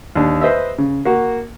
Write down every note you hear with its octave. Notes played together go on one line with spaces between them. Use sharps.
D#2 D4
B4 C5 D#5 E5
C#3
A#3 F#4